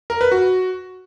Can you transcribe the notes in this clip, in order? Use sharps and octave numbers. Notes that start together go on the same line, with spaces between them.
A#4
B4
F#4